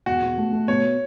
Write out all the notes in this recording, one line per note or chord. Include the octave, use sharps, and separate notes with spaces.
E1 F#4
B2
A3
A3
B2 C#5